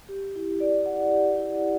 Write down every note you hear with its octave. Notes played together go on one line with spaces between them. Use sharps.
G4
E4
D5
F#5
G4
E4
D5